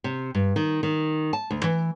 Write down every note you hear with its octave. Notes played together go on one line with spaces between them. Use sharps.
C3
G2
D#3
D#3
A5
D2
E3